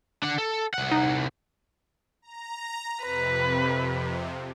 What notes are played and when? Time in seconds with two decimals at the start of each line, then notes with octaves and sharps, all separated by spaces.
0.23 D4 F#5
0.38 A4
0.74 C2 F#5
0.91 D#4
2.22 A#5
3.03 F2 C3 B4